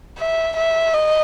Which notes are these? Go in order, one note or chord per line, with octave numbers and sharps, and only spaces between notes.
E5
E5
D#5